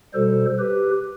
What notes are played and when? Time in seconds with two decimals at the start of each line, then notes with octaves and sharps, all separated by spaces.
0.14 B2 G3 A4 C5
0.59 G4 B4